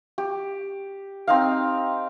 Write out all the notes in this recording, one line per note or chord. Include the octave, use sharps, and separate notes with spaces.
G4
C4 D#4 F5